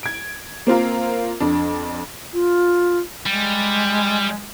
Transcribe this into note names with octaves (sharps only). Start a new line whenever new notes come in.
G#6 D7
A#3 C4 F4 A#4
F2 D4
F4
G3 G#3